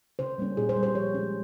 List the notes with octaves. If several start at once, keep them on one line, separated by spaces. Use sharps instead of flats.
C#3 C5
G3 A#3 C#4
A#2 G#4
C5
G3 C#4
C5
F3 C#5
G#3 C#4